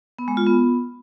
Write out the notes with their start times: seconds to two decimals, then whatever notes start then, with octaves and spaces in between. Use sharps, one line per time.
0.19 B3
0.28 G#3
0.37 F4
0.46 B3